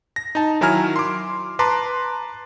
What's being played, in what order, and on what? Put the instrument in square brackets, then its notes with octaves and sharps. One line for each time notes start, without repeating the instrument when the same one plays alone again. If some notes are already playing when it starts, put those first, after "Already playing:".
[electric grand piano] A#6
D#4 A5
D#3 F#3 E4 G#5 A#5 F6
C6 D6
B4 A5 A#5 C6 D6